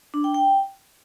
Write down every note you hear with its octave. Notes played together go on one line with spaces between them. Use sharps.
D4
G5
G5